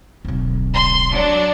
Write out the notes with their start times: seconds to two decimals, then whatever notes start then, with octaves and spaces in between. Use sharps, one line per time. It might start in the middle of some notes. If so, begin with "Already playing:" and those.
0.25 D1 B1
0.74 C6
1.13 F#3 D4